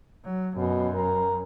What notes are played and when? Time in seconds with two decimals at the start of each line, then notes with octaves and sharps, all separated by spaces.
0.24 F#3
0.57 F#2 B2
0.95 A#4